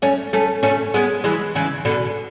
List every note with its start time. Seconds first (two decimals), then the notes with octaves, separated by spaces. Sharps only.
0.02 A3 C#4
0.33 A3 C#4
0.63 A3 C#4
0.94 G#3 B3
1.24 E3 G#3
1.55 C#3 E3
1.85 B2 D3